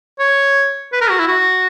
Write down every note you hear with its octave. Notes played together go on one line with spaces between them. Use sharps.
C#5
B4
A#4
F#4
E4
F#4